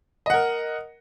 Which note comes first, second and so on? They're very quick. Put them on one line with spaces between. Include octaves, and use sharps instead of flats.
D#5 F#5 A#4